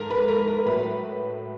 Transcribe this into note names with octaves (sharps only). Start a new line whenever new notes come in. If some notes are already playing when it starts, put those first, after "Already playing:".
Already playing: G#2 A4 A#4
B4
A#4
A#4
A2 F#3 A3 B4